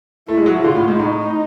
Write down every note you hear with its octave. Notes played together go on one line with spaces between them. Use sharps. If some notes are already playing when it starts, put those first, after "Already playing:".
A3 E4
G#3
F#3
F3
D3 F4
A2
G#2
A2 D#4